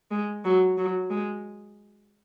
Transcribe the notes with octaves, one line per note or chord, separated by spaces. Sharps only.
G#3
F#3
F#3
G#3